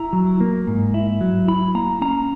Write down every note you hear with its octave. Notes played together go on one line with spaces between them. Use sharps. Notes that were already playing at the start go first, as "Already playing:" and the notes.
Already playing: E4 A#5
F#3
A#3
G#2
E4
F#3
E4 B5
A#3 A#5
C#4 A#5